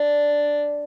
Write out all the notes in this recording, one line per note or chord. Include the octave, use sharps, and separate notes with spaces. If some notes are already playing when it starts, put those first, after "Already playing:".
Already playing: D4